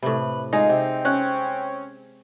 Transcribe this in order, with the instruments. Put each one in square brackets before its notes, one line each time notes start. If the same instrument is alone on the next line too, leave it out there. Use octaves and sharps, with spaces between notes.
[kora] A2 C3 [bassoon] B4
[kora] G#3 G#4 [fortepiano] D#4 [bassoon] F4
[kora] C3 [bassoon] C4
[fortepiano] C#4 F#6